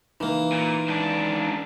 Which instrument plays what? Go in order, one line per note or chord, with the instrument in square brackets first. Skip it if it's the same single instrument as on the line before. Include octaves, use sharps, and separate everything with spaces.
[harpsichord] E3 A#3 [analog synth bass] D#4
[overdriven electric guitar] A#2
C#2 D4